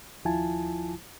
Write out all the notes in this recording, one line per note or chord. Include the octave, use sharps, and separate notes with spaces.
D#2 F3 E4 F4 G#5 A5